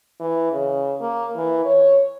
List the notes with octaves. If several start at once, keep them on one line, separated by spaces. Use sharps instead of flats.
E3
C#3
A#3
E3
C#5